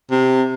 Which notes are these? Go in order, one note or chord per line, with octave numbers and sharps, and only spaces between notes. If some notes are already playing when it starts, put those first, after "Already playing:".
C3